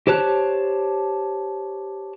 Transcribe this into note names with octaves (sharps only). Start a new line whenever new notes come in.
G4 C5 C#5 A5 F#6